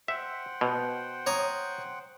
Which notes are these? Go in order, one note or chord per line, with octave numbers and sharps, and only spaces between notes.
C5 E5 F#5 G5
B2
C#5 A#5 D#6